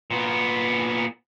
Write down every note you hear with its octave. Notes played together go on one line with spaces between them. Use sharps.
A#2 B3